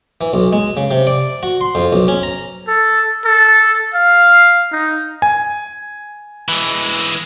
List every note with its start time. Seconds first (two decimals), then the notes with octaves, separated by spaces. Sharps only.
0.21 E3
0.33 B1
0.53 G#3
0.77 C#3
0.91 C3
1.07 D5
1.43 F#4
1.61 C6
1.75 F2
1.93 B1
2.08 C#4
2.23 A#5
2.68 A4
3.25 A4
3.94 F5
4.72 D#4
5.22 G#5
6.49 E3 G#3